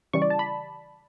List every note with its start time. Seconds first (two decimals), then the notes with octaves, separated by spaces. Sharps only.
0.13 C#3 E3 G3 C#6
0.22 D5
0.30 A5
0.39 B5